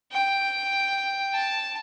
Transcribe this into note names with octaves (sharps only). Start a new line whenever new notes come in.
G5
A5